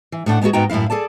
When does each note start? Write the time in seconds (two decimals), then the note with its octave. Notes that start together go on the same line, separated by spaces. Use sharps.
0.12 E3
0.26 A2 A3 D4 F#5
0.41 G#3 B3 D#4 F4 F#4 G#4
0.53 G#2 B3 D#4 F#4 G5 A#5
0.69 F#2 A2 A3 E4 F5
0.90 G#4 A4 D5 A5